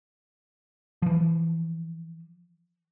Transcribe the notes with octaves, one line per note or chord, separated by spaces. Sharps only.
E3 F3